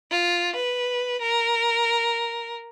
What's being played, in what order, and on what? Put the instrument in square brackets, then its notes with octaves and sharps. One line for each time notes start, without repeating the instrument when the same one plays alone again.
[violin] F4
B4
A#4